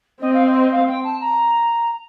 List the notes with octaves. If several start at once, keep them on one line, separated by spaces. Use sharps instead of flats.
C4 D#5
F5
D#5
D#5
F5
G5
A5
A#5